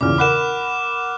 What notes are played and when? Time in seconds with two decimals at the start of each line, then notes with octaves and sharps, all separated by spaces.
0.01 E2 A#2 C#3 D6 F6
0.18 A#4 F#5 B5 D6 F#6 E7